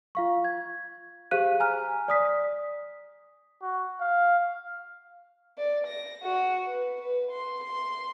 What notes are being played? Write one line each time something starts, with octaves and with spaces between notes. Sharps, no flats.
F4 F5 C#6
G#6
G4 G#4 C5 F5 F#6 D#7
G#5 A#5 F6
D5 D#6 B6
F#4
F5
D5
A#6
F#4
B4
B4
C6
C6